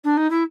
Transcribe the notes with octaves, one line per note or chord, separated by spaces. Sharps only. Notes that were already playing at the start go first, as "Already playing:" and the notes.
D4
D#4
E4